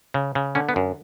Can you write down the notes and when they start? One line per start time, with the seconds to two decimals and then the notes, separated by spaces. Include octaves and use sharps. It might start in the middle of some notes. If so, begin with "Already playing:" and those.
0.14 C#3
0.35 C#3
0.55 D3 C#4
0.69 B3
0.76 F#2